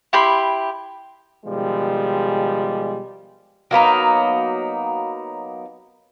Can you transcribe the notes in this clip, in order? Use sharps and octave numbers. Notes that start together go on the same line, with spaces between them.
E4 G4 B5 C6
B2 D#3 F3 G3 G#3
F#3 A#3 B3 D#4